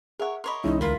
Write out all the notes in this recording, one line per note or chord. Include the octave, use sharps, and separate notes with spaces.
G#4 A#4 C#5 E5 F#5
A#4 C#5 D#5 B5 C6
C2 E3 G#3 C#4 D#4 E4
D2 E4 F4 A#4